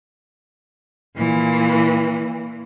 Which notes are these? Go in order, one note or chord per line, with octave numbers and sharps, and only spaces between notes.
A#2 E3